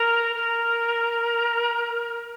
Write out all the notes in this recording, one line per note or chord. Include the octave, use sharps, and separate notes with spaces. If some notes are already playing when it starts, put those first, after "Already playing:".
Already playing: A#4
A#4